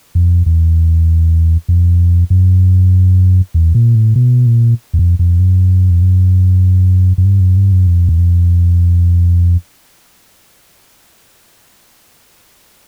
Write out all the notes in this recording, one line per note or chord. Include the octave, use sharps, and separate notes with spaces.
F2
E2
F2
F#2
E2
A#2
A2
B2
A#2
E2
F2
F2
F#2
F2
F#2
F#2
G2
F#2
G2
F#2
F2
E2
F2